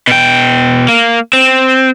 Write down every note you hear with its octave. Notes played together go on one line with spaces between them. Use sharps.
B2 G5
A#3
C4